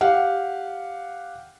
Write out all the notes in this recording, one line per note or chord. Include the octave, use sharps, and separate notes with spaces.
G4 F5 F#5